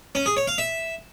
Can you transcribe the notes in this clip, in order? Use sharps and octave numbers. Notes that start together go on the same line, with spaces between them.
C#4
G#4
C#5
F5
E5